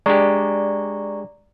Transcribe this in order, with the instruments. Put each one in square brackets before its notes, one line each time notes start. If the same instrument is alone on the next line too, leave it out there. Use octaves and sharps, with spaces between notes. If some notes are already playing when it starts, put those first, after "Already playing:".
[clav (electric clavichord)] G#3 D4 G4 [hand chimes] D5 A#5 C#6